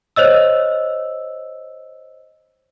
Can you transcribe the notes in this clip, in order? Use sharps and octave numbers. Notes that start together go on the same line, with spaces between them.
C5 C#5 D#5 E6